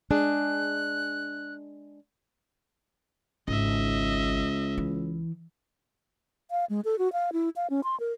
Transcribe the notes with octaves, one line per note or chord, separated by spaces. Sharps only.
G#3 D4 G#4 F#6
G#1 C#2 D#5 E5
E3
F5
G#3
A4
F#4
F5
E4
F5
C#4
C6
A#4